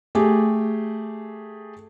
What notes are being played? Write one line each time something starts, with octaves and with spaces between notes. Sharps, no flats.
A3 G4 G#4